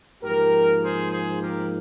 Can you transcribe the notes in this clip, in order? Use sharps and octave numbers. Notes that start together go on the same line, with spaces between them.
G#2 F3 A#3 G4 A#4
G#4 C5
G#4 C5
G4 A#4